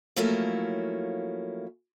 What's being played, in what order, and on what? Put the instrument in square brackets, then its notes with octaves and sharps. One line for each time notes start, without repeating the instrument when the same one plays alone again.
[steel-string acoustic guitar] F3 F#3 A3 A#3 C#4 E4